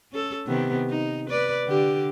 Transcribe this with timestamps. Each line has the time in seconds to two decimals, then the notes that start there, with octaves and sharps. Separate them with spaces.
0.12 C#4 A4
0.46 C3 D#3 B3
0.90 D#4
1.30 B4 D5
1.67 D3 G4